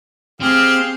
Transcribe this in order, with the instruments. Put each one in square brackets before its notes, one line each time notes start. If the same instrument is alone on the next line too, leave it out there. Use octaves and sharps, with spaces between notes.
[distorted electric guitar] C4 [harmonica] G4 G#4 F5